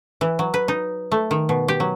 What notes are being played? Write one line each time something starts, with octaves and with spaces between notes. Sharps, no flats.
E3
F#3
B4
D#4
A3
D#3
B2
G4
F#3